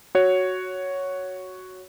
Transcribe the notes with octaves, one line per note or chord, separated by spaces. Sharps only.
F#4 C#5